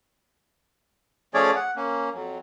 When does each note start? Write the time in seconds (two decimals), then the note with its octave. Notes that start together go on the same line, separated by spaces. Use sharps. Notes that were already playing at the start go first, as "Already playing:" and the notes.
1.34 F3 A3 C#4 G#4 C#5 D5
1.56 F#5
1.76 A#3 C#4
2.14 F2 F#3